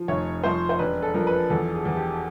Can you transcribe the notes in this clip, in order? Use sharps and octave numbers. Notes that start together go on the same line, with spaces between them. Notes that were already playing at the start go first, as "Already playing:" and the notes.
Already playing: F3
F1 C#5
F3 C5
C5
E1 B4
A4
F3 A#4
B4
E2 A4
G#4
E2
G4